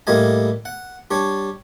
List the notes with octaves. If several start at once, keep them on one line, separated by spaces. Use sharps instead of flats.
A2 G3 A#3 D#5 G#5
F#5
G3 D4 C#5